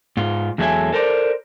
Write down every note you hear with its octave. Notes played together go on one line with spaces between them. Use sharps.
G#2 F4
E2 F#3 G#3 A4 E5 G#5
A4 A#4 C5 D5